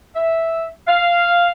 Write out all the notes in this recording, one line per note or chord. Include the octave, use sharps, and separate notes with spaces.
E5
F5